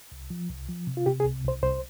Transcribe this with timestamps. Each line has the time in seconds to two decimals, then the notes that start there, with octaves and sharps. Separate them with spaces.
0.12 C2
0.30 F3
0.49 C2
0.68 F3
0.87 C3
0.97 F4
1.06 C3 G4
1.20 G#4
1.25 C2
1.44 C2 C5
1.63 C2 C5